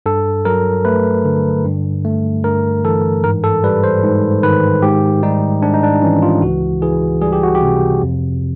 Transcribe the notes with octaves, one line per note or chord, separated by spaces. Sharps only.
G2 A4
F#3 A#4
A3 B4
D3
G2
A3
G2 A#4
E3 A4
G#2 A#4
A4
G3 B4
C5
G#2
D#3 B4
G#2 G4
G3 D#4
G#2 D4
D#4
D4
E3 C#4
F4
C#2 F#4
E3 G#4
G3 G#4
G4
F#4
G4
C3
F2